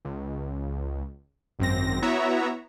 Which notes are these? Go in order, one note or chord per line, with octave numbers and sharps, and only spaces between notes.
C#2
G#1 F#2 C4 A#6
B3 E4 F#4 C#5 E5 A#5